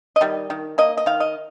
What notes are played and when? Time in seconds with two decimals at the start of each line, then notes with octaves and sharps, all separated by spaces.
0.16 D#5
0.21 D#3 G3
0.50 D#3
0.78 A#3 D#5
0.97 D#5
1.06 D#3 F5
1.20 D#5